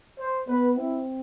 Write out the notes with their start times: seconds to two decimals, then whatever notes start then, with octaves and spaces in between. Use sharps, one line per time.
0.19 C5
0.47 B3 B4
0.77 C4 E4